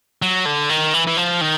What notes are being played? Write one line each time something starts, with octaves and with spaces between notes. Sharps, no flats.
F#3
D3
D#3
E3
E3
F3
D#3